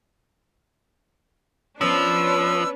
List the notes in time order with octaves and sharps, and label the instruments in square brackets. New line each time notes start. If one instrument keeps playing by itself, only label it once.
[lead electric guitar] F3 [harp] B3 C#4 [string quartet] D4 B4 C#5 [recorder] E6